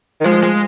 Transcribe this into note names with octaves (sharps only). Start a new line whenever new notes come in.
D#3
F3 G#3
G#3